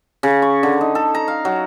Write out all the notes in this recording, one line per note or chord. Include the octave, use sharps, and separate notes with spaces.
C#3
C#6
D3
D#4
A4
A#5
F5
F#3